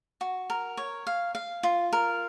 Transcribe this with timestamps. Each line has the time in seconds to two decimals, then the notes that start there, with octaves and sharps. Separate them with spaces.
0.21 F#4
0.50 A#4
0.77 C#5
1.07 F5
1.35 F5
1.63 F4
1.93 A#4